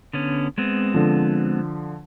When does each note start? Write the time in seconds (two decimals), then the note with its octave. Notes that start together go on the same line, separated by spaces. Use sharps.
0.13 D3 B3 C#4
0.58 G#3 B3 C4
0.94 D3 F3